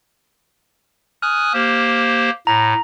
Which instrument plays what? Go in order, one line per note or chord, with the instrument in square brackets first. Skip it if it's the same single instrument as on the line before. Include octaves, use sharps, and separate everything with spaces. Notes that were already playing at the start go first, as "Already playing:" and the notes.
[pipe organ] G#5 D#6 F#6 [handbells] F6
[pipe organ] A#3 G4 C5
[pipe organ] A2 [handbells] A#5